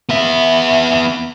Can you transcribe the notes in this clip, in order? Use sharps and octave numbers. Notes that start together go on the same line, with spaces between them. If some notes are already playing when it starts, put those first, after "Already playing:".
B3 E5